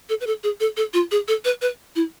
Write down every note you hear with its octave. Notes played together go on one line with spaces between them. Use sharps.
A4
B4
A4
G#4
A4
A4
F4
G#4
A4
B4
B4
E4